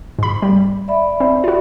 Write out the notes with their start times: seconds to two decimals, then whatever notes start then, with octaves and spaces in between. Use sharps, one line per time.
0.19 G#2 B5
0.42 G3
0.88 D5 E5 B5
1.20 C4
1.44 F4 F#4